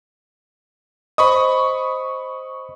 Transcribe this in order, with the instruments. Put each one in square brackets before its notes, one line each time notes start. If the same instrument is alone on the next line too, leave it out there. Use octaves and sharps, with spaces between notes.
[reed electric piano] C5 D#5 [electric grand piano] B5 C#6 D#6